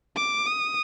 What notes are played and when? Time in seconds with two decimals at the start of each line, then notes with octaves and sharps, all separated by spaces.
0.16 D6
0.46 D#6